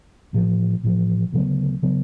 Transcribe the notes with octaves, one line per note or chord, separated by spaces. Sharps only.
A1 A2 F3
A1 A2 F3
D2 C#3 F#3 B3
C#3 F#3 B3